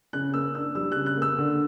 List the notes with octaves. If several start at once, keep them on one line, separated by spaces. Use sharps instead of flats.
C#3 F#6
A#3 E6
D4 E6
G3 E6
F#6
C#3
F#6
A#3 E6
D3